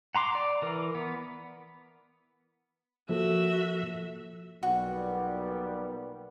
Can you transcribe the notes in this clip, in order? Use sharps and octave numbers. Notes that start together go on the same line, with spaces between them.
F#5 A#5 C6 D6
D5
E3 A#4
B3
F3 A#3 F#4 A4 E5
B1 A#2 G3 B3 F#4